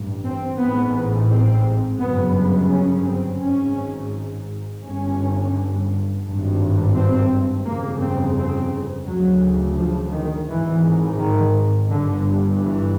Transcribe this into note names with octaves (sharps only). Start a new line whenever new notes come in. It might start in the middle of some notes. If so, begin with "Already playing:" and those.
Already playing: A1 G2
C4
A1 G#2 B3
C4
G1 F#2 C#3 B3
B3
C#4
C4
G#1 G#2 C#4
G1 G2 C#4
G#1 G2
C4
G1 F2 C#3 A#3
C4
C4
D2 C#3 F#3
F3
D#3
G#1 G#2 E3
D#3
G1 G2 D3
E3